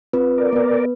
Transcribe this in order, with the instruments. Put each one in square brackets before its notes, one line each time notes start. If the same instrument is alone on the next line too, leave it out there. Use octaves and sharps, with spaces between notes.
[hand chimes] C4 F4 B4
[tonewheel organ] A#4 D5
[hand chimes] B3 B4